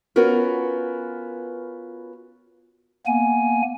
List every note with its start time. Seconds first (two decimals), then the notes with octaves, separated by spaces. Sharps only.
0.16 B3 C#4 F4 F#4 A#4 B4
3.06 A#3 B3 G#5